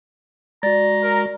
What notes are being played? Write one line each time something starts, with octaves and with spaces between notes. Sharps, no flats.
G#3 F#4 D5 A#5
A#4